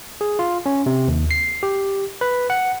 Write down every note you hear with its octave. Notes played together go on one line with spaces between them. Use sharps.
G#4
F4
C#4
C3
D#2
C7
G4
B4
F#5